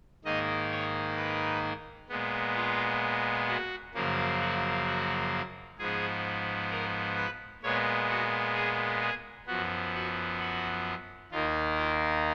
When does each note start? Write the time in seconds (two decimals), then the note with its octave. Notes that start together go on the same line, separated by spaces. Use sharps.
0.25 G#2 D#3 A#3 D#5
0.71 C#5
1.17 B4
2.09 A#2 G#3 B3
2.55 F4
3.47 F#4
3.94 F#2 C#3 F3 A#3
4.40 F#4
4.86 F#4
5.78 G#2 F3 B3 G#4
6.71 A#4
7.17 B4
7.63 A#2 G#3 B3 C#5
8.09 F#4
8.55 G#4
9.01 G#4
9.47 F#2 F3 B3 F#4
9.94 F#4
10.39 F#4
11.31 D#2 D#3 A#3 F4
11.78 F4